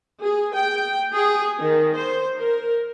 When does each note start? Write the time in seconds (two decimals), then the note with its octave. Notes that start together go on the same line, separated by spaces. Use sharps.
0.22 G#4
0.55 G5
1.13 G#4
1.58 D#3
1.97 C5
2.39 A#4